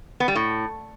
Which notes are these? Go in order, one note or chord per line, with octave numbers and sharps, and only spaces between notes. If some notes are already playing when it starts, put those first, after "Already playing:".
B3
G3
A2